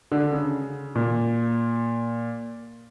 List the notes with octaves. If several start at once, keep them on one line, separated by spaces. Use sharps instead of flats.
D3
C#3
A#2